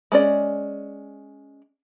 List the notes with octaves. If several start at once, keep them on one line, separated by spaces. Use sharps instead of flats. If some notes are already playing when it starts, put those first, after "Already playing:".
G#3 C#4 D5